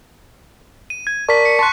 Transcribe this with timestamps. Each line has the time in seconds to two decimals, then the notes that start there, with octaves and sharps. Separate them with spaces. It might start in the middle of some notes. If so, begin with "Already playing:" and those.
0.90 D#7
1.07 G#6
1.29 A#4 D5 A5 C#6 B6
1.45 C#7
1.59 A5 C6 C#6 F#6